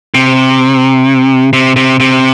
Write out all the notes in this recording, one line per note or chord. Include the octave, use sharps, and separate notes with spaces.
C3
C3
C3
C3